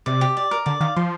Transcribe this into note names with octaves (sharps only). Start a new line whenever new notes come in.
C3 D5
G4
D5
A#4
D3 D5
D#3 F5
F3 C6